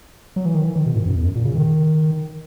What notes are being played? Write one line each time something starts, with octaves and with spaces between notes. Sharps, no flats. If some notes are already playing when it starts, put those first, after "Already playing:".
F#3
E3
D#3
E3
D#3
B2
G#2
F#2
E2
F#2
A#2
C#3
D#3